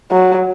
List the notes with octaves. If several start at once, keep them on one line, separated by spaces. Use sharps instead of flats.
F#3